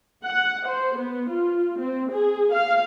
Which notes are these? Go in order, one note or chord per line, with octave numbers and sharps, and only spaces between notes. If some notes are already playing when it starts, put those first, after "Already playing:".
F#5
C5
B3
F4
C4
G#4
F5